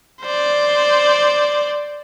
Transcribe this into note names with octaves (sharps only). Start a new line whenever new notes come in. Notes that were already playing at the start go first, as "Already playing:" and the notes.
C5 D5